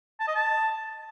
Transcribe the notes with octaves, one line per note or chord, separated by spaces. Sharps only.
A5
D#5
A5